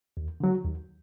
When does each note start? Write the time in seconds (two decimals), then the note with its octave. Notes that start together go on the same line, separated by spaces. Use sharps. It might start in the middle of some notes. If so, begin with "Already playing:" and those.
0.17 D#2
0.40 D3 F#3
0.64 D#2